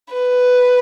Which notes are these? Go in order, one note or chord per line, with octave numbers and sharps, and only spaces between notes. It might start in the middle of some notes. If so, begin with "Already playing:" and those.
B4